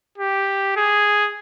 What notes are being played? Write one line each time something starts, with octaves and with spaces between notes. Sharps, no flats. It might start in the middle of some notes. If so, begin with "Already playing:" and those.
G4
G#4